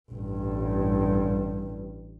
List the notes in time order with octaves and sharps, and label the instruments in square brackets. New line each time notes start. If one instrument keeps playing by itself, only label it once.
[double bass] A1 G2